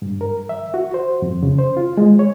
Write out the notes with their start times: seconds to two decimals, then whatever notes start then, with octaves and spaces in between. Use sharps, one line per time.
0.02 G2
0.21 A#4
0.49 E5
0.74 F#4
0.94 C5
1.22 F2
1.43 C#3
1.58 C5
1.77 F4
1.97 G#3
2.19 C#5